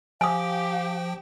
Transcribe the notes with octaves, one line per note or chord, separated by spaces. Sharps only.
F3 G4 F5 G5 G#5 D#6